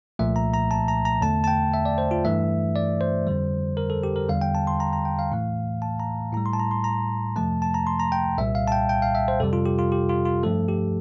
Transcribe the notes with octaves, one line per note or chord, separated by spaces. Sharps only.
C2 A#2 F3 A3 E5
A#5
A#5
A5
A#5
A#5
E2 D3 A3 A5
A5
G5
E5
D5
C5
F4
G2 E3 A3 E5
D5
C5
F2 D3 G3
A#4
A4
G4
A#4
E2 D3 G3 F5
G5
A5
C6
A#5
A#5
G5
F5
A2 E3 A3
A5
A#5
A2 G3 A#5
C6
A5
A#5
C6
A#5
F2 C3 F3 A3 A5
A5
A#5
C6
A#5
G5
C2 A#2 G3 E5
F5
A5
G5
G5
F5
E5
C5
F2 C3 G3 A4
F4
G4
F4
G4
F4
F4
G2 F3 A3 A4
G4